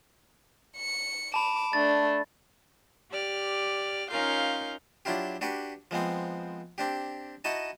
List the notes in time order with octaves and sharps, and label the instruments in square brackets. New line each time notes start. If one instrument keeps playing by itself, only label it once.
[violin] C#7
[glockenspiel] A5 B5 [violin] D6 E7
[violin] A3 D4 [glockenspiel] A6
[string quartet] G4 D5 F6
C#4 D#4 F4 A#4 F5 G6
[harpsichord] F#3 D4 E4 F4 G4
D4 F#4 G4 B4
F3 G#3 B3 C4
C4 D4 G4
D#4 E4 F#4 D#5 A5